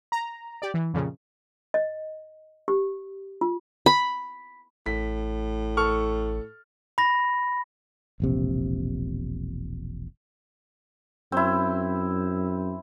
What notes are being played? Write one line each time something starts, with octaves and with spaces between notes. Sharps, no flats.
A#5
G4 D5
E3
F2 A#2 C#3
D#5
G4
F4
B5
A1 A2 B6
A4 C#6 F6
B5 A#6
E1 A#1 C3
F#2 C4 E4